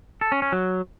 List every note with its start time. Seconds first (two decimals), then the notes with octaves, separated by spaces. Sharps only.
0.21 A4
0.32 C#4
0.42 C#4
0.52 F#3